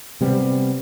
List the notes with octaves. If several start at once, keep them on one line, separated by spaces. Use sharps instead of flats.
C3 G3 B3 C4